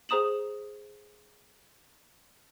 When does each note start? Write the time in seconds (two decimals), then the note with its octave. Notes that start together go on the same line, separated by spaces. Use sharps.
0.09 G#4 C5 A#5 D#6 E7 F#7